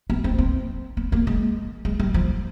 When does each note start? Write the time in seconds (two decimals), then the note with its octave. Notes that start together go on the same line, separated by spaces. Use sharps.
0.10 B3
0.24 C4
0.39 C4
0.97 B3
1.12 A#3
1.27 G#3
1.85 G#3
2.00 G3
2.14 F3